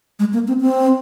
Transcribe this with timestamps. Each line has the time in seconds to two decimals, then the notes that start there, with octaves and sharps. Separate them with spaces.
0.19 G#3
0.33 A#3
0.48 C4
0.61 C4